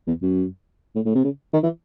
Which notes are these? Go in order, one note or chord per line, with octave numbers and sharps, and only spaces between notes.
E2
F#2
A2
A2
C3
C#3
D#3
E3